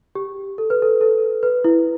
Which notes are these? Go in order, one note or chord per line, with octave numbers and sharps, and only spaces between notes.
G4
A4
B4
A4
A4
B4
E4